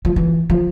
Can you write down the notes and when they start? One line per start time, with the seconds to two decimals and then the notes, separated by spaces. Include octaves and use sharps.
0.05 F3
0.16 E3
0.50 F3